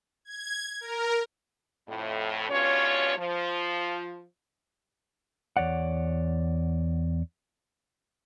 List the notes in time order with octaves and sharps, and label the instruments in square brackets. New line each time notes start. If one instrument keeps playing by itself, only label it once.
[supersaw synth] G#6
A#4
[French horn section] F2 A2
G2 B2 C#4 F4 C#5
F3
[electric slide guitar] E2 C#5 D5 F#5